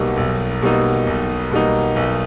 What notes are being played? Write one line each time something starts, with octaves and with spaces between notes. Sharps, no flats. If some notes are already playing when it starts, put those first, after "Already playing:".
Already playing: B1 B2 G3 A#3 D#4
B1
B2 G3 A#3 D#4
B1
B2 G3 A#3 D#4
B1